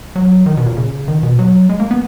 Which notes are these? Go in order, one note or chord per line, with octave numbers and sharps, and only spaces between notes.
F#3
D#3
B2
A#2
C#3
D#3
B2
F#3
G#3
A#3
B3